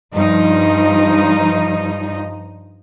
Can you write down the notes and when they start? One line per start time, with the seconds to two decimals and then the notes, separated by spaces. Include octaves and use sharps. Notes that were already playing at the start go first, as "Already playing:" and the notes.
0.14 G2 F3 D#4